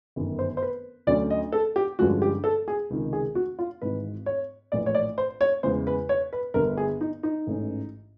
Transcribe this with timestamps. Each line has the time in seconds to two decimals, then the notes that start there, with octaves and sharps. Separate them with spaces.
0.16 G1 F#2 D#3
0.39 C5
0.57 C5
0.62 B4
1.07 D2 D3 F#3 A3 C#4 D5
1.30 D#5
1.52 A4
1.76 G4
1.99 G2 D3 F3 G#3 C#4 F#4
2.22 G4
2.44 A4
2.68 G#4
2.90 C#2 C3 D#3
3.13 G#4
3.35 F#4
3.59 F4
3.82 G#1 G#2 E3 B4
4.26 C#5
4.72 A#1 A2 E3 D5
4.86 C#5
4.95 D5
5.18 C5
5.41 C#5
5.63 E2 C#3 E3 G#3 C5
5.87 B4
6.09 C#5
6.33 B4
6.54 G1 G2 D3 A#4
6.77 G#4
7.01 D#4
7.23 D#4
7.47 A1 G#2 E3 A3 C#4